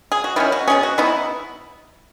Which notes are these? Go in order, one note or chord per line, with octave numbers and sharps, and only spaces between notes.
G#4
F#4
D#3 F#3 C#4 E4
F#4
B2 F#3 C#4 G#4
F#4
E3 B3 D#4 E4